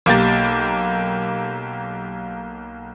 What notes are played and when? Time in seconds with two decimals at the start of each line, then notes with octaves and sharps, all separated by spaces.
0.06 B1 A#3 G4 A6